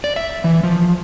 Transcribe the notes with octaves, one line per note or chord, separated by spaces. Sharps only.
D5
E5
E3
F3